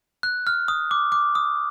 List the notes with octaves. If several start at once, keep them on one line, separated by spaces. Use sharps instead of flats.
F#6
F6
D#6
D6
D6
D#6